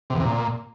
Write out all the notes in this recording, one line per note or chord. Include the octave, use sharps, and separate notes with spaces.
C3
E2
C3
A#2